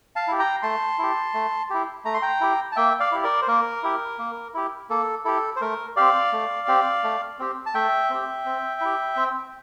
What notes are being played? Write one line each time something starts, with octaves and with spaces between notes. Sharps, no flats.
F5 A5
E4 G4
G5 A#5
A3 A5 C6
E4 G4
A3
E4 G4
A3 A#5
C6
G5 A#5
E4 G4
A5
A#3 E5 G5
D5 F5
E4 G4
A#4 D5
C5
A#3 A#4
E4 G4
A#3
E4 G4
A#3 A4
E4 G4 A4
C5
A3 A#4
C4 G4 D5 F5
A3
C4 G4
A3
C4 G4
A5
A3 E5 G5
C4 G4
C4
E4 G4
C4